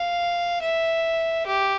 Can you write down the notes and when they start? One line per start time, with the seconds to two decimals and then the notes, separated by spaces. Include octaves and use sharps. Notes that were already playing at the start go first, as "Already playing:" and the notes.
Already playing: F5
0.62 E5
1.46 G4